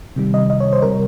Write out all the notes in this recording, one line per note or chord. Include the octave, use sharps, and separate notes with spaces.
C3 D#3 G3
D#5
D#5
C#5
C5
C3 G3 A#4